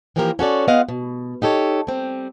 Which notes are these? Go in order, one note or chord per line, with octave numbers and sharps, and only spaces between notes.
E3 F3 A#3 B3 G4 A#4
C#4 F#4 A4 D5
B3 F4 G#4 D#5 F5 F#5
B2
D#4 G4 A4 C#5
G3 C4